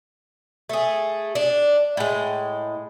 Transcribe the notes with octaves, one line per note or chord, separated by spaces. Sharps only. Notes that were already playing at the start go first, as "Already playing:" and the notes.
A3 G#4
D4
A2 G#3